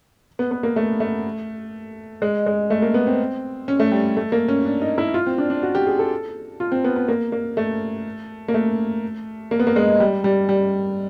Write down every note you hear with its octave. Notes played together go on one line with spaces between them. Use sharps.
B3
B3
A#3
A3
A3
G#3
G#3
A3
A#3
B3
C4
C#4
A3
G3
A3
A#3
C#4
D4
D#4
E4
F4
C4
D4
D4
F#4
G4
G#4
A4
F4
C4
B3
B3
A#3
A#3
A3
A#3
A3
A#3
B3
A#3
G#3
G3
G3
G3